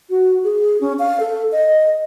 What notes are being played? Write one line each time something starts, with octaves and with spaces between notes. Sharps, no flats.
F#4
G#4
C#4
F5
A4
D#5